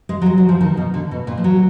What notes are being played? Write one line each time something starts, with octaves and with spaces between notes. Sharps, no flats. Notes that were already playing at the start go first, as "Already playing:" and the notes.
G#3
F#3
G#3
F#3
F3
D#3
B2
D3
B2
A#2
F3
F#3